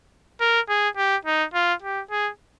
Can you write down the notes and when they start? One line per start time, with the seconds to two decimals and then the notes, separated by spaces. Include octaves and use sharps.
0.41 A#4
0.69 G#4
0.97 G4
1.25 D#4
1.54 F4
1.83 G4
2.11 G#4